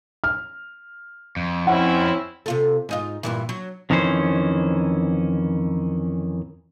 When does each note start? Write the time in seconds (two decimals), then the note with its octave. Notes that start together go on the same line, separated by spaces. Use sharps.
0.24 F6
1.36 F2
1.67 C4 C#4 E4 F#5
2.46 C3 F4 A4
2.89 G#2 D#4 F4
3.23 G2 A#2 E3
3.49 F#3
3.90 F2 D#3 E3 C#4 C5